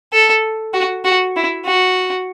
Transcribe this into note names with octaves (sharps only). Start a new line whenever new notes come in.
A4
F#4
F#4
E4
F#4